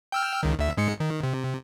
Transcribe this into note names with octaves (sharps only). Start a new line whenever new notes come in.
G5 E6 F6
C#2 D#3
D2 E5
G#2 G#3 C#7
D#3
C3